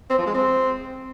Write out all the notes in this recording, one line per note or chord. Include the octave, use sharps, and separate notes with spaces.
C4
F3
G#3
C4